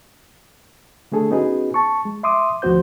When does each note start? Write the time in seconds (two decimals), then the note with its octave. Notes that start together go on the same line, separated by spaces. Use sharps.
1.12 D3 A3 D4 G#4 A4
1.31 B3 C#4 D#4 F#4 G#4 B4
1.74 A5 C#6
2.05 G#3
2.23 E5 C6 D6 D#6
2.62 D2 F3 B3 F#4 C5 G6